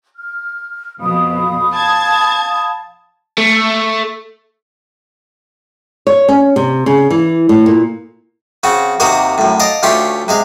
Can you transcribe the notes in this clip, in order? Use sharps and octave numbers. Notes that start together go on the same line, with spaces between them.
F6
F2 B2 F5 B5 D#6
A5 G#6
A3
C#5
C#4
C3
C#3
E3
A2
A#2
C#3 C4 F#4
D#2 C3 A#3 F#4 A#4 D#6
F#2 A2
D#5 F5 A5 D6
D2 A3 C#4 F4 G4 C6
C3 G#3 F5